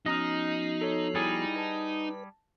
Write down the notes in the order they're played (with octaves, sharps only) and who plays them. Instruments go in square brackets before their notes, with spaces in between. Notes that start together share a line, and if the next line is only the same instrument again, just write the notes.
[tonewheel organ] F3 B3 F#4 [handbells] C#4 A#5 F6 [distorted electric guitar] D#4 [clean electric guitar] D#5
[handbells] A4 C#5
[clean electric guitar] G3 G#4 [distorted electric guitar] D#4 [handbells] E4 A6
[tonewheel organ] B4 [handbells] A5 A#6